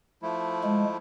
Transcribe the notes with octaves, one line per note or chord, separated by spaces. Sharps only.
F3 A3 E4
G#3